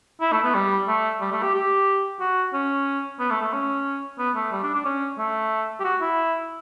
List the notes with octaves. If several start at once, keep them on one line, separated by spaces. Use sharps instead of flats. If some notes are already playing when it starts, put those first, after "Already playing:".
E4
A3
B3
G3
A3
G3
A3
G4
G4
F#4
C#4
B3
A3
A3
C#4
B3
A3
G3
D4
D4
C#4
A3
G4
F#4
E4